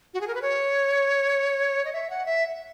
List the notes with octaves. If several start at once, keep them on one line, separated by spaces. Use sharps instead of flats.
F#4
G#4
A#4
B4
C#5
D#5
E5
F#5
E5